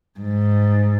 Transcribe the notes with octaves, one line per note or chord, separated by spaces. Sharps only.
G#2